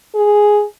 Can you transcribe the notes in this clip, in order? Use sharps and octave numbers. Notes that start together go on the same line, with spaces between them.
G#4